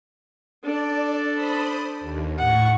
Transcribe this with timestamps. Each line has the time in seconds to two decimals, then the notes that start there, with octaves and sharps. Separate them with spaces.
0.63 D4 A4 D5
1.34 C5 B5 D#6
2.00 D#2
2.38 A2 F#5 C#6